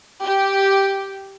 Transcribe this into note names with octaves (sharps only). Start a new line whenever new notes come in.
G4